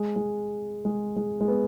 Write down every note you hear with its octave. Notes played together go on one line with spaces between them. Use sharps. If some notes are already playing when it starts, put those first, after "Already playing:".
Already playing: G#3
G#3
G#3
G#3
G#3
B3